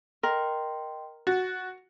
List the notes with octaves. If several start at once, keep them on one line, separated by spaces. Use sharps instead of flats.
A#4 D#5 G5 C6
F#4 A6